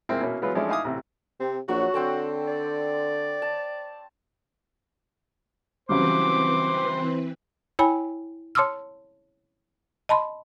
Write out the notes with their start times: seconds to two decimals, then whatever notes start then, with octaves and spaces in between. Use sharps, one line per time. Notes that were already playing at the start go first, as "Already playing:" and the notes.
0.09 A#2 G#3 A#3 C4 E4
0.21 B2 A#3 C#4 E4
0.42 E3 F#3 G#3 B3 F4 B4
0.55 F3 G#3 A3 C#4 D4 E4
0.69 D#4 E4 F5 G#5 D6 D#6
0.84 A1 C3
1.40 C3 C4
1.68 A#1 F#3 F#4 C#6
1.94 D3 C4 G5 A5
2.48 D5
3.42 A5
5.89 C#3 E3 F#3 G3 C4 B4 C5 D6
7.79 E4 C#5 G5 G#5 B5
8.55 C#5 A5 C6 D6 E6 F6
10.09 D#5 A5 B5 C6